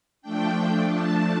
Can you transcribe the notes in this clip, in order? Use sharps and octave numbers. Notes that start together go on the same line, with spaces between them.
F3 A3 D4 G5
A5